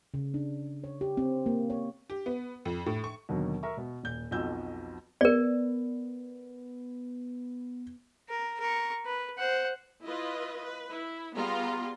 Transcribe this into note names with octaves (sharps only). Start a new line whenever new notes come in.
C#3
D4
C#5
G4
C4
A#3
C#5
G4
B3
F2
A2
C#6
D#2 B2 D3 F#3
A#4 E5 C#6
B2
D#1 G6
B1 F2 B2 F3 E6 G6
B3 A#4 D5
A#4
A#4 C#6
B4
C5 F#5
E4 F4 B4 D#5
B4
E4
G3 B3 F4 G#4 A#5 C6